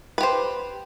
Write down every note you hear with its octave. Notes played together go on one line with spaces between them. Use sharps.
G4 B4 C5